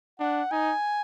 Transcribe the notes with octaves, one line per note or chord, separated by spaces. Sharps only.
D4 F#5
D#4 G#5